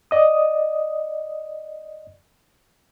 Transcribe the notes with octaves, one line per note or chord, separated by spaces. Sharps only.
D5 D#5 D#6